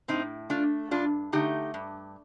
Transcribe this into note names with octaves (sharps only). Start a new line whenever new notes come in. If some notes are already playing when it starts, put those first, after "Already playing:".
A2 C4 D#4
A3 D4 F4
G2 D4 F4
D3 A3 D#4 G4
G2